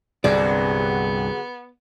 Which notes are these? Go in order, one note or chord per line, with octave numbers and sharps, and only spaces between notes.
C2 G2 D3 F#3 B3 G#4 D5